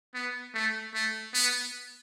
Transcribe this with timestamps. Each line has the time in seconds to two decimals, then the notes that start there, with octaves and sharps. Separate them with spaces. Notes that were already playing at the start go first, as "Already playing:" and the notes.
0.14 B3
0.54 A3
0.94 A3
1.34 B3